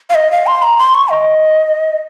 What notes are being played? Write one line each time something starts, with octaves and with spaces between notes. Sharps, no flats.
F5
D#5
F5
C6
A#5
C6
C#6
D#5